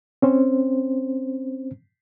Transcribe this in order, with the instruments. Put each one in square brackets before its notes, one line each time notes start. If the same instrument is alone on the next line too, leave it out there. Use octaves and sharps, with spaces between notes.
[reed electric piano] C4 C#4 C5